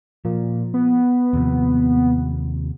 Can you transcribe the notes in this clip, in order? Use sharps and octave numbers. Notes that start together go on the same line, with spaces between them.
A#2 F3
B3
D#2 C3 F3